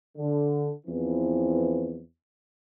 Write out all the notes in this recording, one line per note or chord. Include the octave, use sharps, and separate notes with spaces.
D3
E2 E3 F3 C4